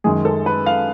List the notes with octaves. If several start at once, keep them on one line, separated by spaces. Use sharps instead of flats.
F#2 D#3 G#3 G#4
A4
B4
F5